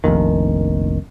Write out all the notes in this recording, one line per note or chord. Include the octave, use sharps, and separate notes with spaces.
F1 A#1 D#3